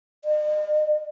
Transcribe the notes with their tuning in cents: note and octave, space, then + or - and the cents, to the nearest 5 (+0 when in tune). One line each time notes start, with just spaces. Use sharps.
D#5 -45